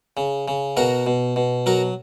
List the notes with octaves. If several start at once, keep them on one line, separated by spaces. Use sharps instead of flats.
C#3
C#3
B2 F#4 A#4
B2
B2
F#3 F#4 A#4